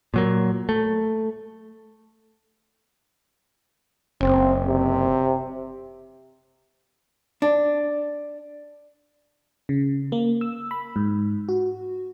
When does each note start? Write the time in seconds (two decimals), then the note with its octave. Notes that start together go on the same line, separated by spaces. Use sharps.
0.14 A#2 F#3 A#3
0.69 A3
4.21 F#1 C4
4.67 C3
7.42 D4
9.69 C#3
10.12 A#3
10.41 E6
10.71 B5
10.96 G#2
11.49 F#4